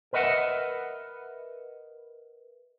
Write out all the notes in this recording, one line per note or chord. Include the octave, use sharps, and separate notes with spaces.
A#4 B4 D#5 E5 F#5